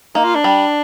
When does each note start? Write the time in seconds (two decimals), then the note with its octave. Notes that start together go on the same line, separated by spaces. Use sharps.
0.15 A#3 D#4
0.24 F4
0.35 D4
0.44 G3